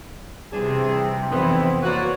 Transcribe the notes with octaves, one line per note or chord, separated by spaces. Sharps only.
C3 E3 G3 C4 D4 G#4
F2 C3 D#3 E3 G3 B3 E4 C5
A#3 F#4 B4 C#5 D5